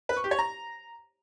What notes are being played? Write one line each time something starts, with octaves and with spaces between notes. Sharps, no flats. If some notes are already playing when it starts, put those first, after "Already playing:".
B4
C#6
G4
C#5
A#5